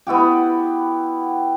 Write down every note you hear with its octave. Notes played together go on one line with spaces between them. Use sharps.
B3 E4 F#4 G4